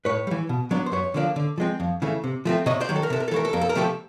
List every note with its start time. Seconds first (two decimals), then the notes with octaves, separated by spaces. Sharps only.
0.05 A2 B4 C#5
0.27 G3
0.31 E3
0.49 B2
0.71 F#3 B3 D4
0.86 C5
0.92 F#2 B4 C#5
1.14 D3 F3 A#3 D4
1.36 D3
1.58 F3 G#3 C4
1.80 F2
2.02 C#3 E3 A3
2.24 C3
2.45 F3 A3 C4
2.66 C3 C#5 D#5
2.81 C5 D5
2.89 D#3 F#3
2.96 A4
3.03 A#4
3.10 C3 A4
3.20 A#4
3.28 A4
3.31 E3 A3 A#4
3.45 A4
3.53 F2 A#4
3.61 A4
3.69 A#4
3.75 C3 F3 A3 G4 A4